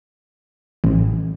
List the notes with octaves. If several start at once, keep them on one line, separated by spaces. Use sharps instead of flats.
A1